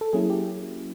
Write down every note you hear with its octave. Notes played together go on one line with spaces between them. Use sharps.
A4
F#3 A#3 C#4 E4 G#4
G4